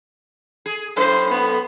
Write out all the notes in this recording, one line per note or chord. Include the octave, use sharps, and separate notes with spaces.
G#4
F#2 A2 A4 C5
B3